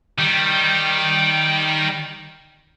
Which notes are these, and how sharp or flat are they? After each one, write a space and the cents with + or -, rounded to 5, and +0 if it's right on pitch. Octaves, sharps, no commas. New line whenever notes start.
D#3 +0 G3 +0